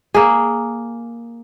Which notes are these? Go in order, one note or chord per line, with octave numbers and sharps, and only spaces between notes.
A#3 G#4